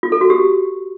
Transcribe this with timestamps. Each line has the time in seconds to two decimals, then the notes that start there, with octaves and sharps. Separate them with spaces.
0.03 F4
0.12 A4
0.21 F#4
0.30 G4